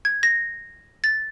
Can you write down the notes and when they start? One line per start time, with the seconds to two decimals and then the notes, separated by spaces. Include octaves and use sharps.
0.05 G#6
0.23 A#6
1.04 A6